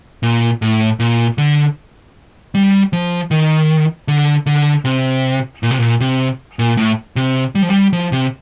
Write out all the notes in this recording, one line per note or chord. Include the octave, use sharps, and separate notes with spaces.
A#2
A2
A#2
D3
G3
F3
D#3
D3
D3
C3
A#2
C3
A#2
C3
A#2
A2
C3
G3
F3
G3
F3
C3